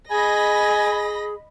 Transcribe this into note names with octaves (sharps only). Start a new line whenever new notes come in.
G#4 D#5 G#5 B5 A#6